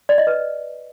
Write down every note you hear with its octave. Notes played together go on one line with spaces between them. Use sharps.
D5
D#5
B4